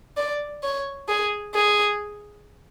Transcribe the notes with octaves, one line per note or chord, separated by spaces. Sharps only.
D5
C#5
G#4
G#4